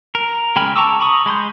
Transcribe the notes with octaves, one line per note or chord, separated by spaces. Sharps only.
A#4
C#3 G#3 G5 B5 F6
A5 A#5 C#6 D6 E6
A#5 B5 C#6 D#6
G#3 B5 C6 G6